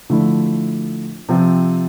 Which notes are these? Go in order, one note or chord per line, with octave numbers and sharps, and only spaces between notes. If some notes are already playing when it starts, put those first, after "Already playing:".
D3 F3 A3 E4
C3 F3 C4